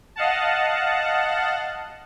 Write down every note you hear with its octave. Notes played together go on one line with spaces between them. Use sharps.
D#5 F5 F#5 A5